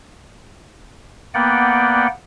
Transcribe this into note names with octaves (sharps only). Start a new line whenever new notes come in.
A#3 B3 D5 F#5 G5